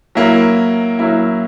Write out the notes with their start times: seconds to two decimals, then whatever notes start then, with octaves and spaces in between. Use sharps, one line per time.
0.15 F#3 A#3 E4
0.99 F#3 A#3 E4